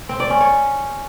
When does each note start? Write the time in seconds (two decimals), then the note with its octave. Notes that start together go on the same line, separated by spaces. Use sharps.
0.09 C4
0.20 D5
0.30 C#4
0.41 C#5